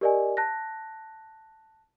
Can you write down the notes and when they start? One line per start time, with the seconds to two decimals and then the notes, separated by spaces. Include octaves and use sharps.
0.01 G4 A#4 D5 D#5 G#5
0.37 A5 F#6 A#6